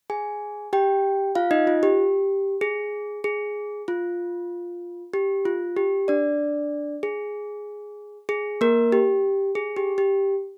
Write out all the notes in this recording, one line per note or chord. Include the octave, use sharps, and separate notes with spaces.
G#4 G#5
G4 G5
F4 F5
D#4 D#5
F4
G4
G#4
G#4
F4
G4
F4
G4
D4 D5
G#4
G#4
A#3 A#4
G4
G#4
G4
G4